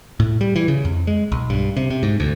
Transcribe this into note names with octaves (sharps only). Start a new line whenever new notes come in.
A2
G3
E3
C#3
F2
G#3
B1
G2
C3
C3
G#2
D2